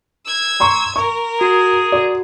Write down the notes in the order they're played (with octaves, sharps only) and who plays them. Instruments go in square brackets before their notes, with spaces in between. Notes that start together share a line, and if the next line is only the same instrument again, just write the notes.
[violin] E6 G#6
[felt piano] A#5 C6 C#6
[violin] A#4 [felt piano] C#6
[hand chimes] F#4 [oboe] G#4
[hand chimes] F#4 [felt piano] D5